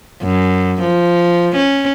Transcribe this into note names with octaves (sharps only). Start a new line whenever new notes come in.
F#2
F3
C#4